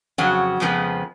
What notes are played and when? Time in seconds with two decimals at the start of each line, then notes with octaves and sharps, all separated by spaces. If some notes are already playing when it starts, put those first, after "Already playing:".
0.18 F2 C#3 F#3 C#4 F#4
0.60 F2 C#3 F3 G#3 B3